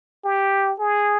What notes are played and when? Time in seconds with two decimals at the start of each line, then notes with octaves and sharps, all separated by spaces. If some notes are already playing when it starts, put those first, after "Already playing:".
0.25 G4
0.79 G#4